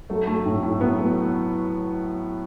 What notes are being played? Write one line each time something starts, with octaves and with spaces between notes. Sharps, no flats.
F#3 A3
A3
A2
A2
F#3 B3
A3